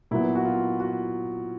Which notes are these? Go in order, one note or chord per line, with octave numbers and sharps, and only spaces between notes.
A#2 F#3 B3 E4
F#4
F4
F#4